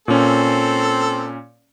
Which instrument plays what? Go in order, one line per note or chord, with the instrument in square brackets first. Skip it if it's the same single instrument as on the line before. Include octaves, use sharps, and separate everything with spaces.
[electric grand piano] A#2 C#4 [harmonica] C4 A4